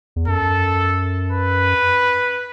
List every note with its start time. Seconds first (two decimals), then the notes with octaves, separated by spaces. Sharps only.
0.16 E2
0.28 F#2 A4
1.32 B4